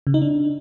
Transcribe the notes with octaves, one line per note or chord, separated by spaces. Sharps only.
C#3
D#4
D4